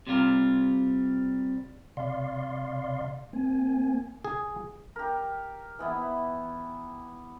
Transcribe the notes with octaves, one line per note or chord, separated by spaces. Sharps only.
C3 G3 F4 A#4
C3 D5 F5 C6
A#3 C4 G#5
G#4
G4 A#4
E3 B3 E4